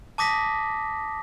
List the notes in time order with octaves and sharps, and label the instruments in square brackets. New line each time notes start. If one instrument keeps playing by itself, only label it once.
[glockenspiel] A5 D6 D#6 A#6 B6